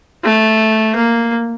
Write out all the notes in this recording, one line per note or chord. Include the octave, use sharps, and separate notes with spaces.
A3
A#3